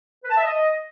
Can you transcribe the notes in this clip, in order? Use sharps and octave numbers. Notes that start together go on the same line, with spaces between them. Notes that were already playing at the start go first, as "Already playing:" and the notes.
B4
A5
E5
D#5